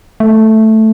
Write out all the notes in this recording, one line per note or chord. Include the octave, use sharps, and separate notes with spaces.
A3